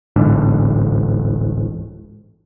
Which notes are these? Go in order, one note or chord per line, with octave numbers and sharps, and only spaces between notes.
D1 A1 G#2 D3